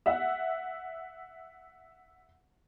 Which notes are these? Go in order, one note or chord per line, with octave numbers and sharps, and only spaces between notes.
E5 F#5